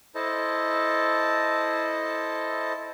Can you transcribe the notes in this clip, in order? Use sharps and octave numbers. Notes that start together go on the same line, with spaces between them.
E4 A4 C5 D#5 A5